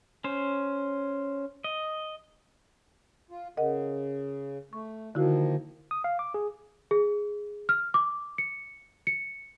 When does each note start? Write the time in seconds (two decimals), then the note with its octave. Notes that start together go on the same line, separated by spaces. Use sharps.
0.24 C#4 C5
1.64 D#5
3.31 F4
3.57 C#3 A#4 D#5 F#5
4.73 A3 C#6
5.15 D3 D#3 F3 A#3 E4 F#4
5.91 D#6
6.04 F5
6.19 D6
6.34 G#4
6.91 G#4
7.69 F6
7.94 D6
8.38 C#7
9.07 C#7